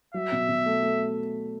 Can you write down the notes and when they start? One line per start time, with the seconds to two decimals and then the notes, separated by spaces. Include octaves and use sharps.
0.14 F#3 E5
0.32 B2
0.48 B2
0.66 A3
0.83 A3